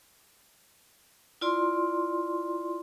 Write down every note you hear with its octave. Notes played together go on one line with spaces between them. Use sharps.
E4 F4 D5 C6